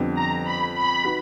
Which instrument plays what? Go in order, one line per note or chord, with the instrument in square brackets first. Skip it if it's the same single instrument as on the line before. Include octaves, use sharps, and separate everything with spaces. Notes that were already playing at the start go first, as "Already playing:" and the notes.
Already playing: [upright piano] F2 D3 G3 B3 D4
[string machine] A#5
B5
B5
[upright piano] D#4 F#4 B4